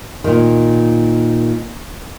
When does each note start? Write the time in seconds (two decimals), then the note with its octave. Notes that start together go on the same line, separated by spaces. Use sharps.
0.24 A#2 D#3